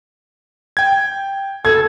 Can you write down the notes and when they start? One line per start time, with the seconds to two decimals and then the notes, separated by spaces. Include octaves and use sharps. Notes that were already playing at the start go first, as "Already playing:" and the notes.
0.77 G5 G#6
1.65 A4 G#6